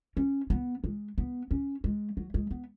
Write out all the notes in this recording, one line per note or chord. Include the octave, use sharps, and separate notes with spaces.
C#4
B3
G#3
B3
C#4
G#3
F#3
G#3
B3